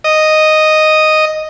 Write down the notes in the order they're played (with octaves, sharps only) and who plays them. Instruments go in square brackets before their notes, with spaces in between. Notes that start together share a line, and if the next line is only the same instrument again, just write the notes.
[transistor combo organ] D#5